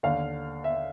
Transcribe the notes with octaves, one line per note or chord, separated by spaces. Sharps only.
D#2 D3 F5
E5